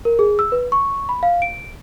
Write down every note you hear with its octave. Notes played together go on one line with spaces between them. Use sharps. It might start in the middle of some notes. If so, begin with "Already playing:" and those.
A#4
G#4
E6
B4
C#6
B5
F5
D7